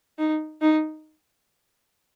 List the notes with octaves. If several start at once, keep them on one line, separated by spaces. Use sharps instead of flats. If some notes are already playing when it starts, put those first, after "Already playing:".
D#4
D#4